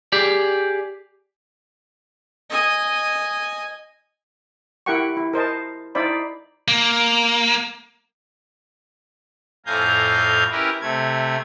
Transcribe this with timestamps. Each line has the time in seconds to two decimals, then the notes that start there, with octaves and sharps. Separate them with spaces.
0.12 G4 G#4 D5
2.50 D#5 G#5
4.86 E4 G4 A#4 F#5 G5 C#6
5.17 E4
5.33 A#4 C5 D#5 A5
5.95 D#4 E4 C5 D5 B5
6.68 A#3
9.66 F2 A2 F5 G#5 A#5 G6
10.51 C#4 E4 G4 A#4 B4
10.82 C3 A3 G#6